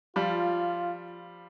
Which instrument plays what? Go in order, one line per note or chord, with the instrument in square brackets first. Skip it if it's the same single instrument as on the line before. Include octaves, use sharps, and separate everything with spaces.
[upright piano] F3 G3 [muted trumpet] F4